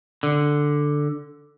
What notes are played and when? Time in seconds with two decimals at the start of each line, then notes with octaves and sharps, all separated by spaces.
0.23 D3